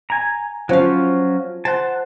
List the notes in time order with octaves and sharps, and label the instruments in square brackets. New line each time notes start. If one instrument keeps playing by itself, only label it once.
[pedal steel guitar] G#5 A#5
[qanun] F3 F5 [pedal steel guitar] F#3 C#4 F4
[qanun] C5 [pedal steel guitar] F#5 A5